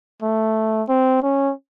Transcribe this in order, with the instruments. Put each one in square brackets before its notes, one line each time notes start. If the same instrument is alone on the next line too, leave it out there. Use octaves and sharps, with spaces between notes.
[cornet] A3
C4
C#4